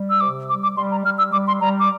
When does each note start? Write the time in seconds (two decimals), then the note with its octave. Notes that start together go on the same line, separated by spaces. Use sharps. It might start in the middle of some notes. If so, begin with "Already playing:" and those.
Already playing: G3
0.10 E6
0.20 C3 D6
0.48 G3 D6
0.63 D6
0.76 G3 C6
0.91 A#5
1.05 G3 F6
1.18 E6
1.32 G3 D6
1.47 C6
1.61 G3 A#5
1.79 D6